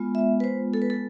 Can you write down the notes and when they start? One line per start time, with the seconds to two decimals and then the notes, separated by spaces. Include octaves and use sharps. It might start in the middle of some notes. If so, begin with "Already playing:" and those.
Already playing: G#3 B3 F4
0.15 E5
0.40 B4
0.44 C5
0.74 A4
0.82 B4
0.90 A4